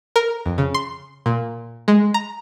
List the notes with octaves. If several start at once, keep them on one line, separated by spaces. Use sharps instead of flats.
A#4
F2
C#3
C6
A#2
G#3
A#5